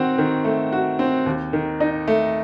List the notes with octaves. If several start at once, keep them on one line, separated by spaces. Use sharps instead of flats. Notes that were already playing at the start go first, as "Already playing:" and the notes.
Already playing: D#3 C4 F#4
D#3
A3
F#4
C4
D#2
D#3
D#4
A3